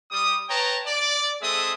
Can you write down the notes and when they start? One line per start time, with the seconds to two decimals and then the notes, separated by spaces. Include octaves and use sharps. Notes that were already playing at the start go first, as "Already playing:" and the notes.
0.11 G3 D#6
0.49 B4 C#5 G5 A5 A#5
0.86 D5
1.42 G#3 C4 G#4 A4 E5 D#6